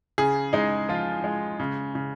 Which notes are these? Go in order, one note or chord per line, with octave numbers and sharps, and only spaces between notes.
C#3 G#4
G#3 D#4
F3 F4
G#3
C#3
C#3